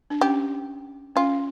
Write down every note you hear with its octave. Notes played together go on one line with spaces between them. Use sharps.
D4
C#4 G4
C#4 F4